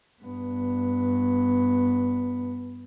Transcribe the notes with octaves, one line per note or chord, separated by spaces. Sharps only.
G2 B3